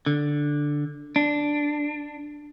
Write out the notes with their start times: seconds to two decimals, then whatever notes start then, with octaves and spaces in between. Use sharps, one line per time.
0.06 D3
1.16 D4